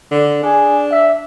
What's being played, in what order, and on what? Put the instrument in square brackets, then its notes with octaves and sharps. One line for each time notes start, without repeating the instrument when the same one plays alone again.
[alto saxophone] D3
[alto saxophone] D4 [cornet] G#4
[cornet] E5